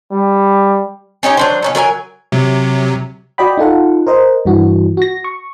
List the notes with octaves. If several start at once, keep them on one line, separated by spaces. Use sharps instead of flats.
G3
C#4 D#4 G4 C#5
F#3 D4 C5
B2 C#4 D#4
F#3 A#4 C#5 G#5
C3 F#3
F#4 D5 D#5 G5 B5
D#4 F4 A4 F#5
A#4 C5 D#5
G2 E3 F#4
F#4 A#6
C#6